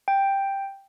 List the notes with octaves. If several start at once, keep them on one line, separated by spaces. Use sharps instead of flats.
G5